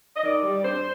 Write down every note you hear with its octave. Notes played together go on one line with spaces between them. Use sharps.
D#5
D#3 D5
G3
G2 C5